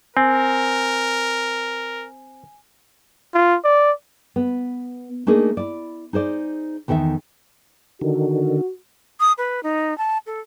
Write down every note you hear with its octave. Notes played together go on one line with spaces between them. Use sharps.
C4 A#4 G#5
F4
D5
B3
A3 A#3 D4 D#4 G#4 A#4
E4 D5
D#4 G#4 C5 D5
E2 D#3 A4 B4 E5
D3 D#3 F#4
D#6
B4
D#4
A5
A4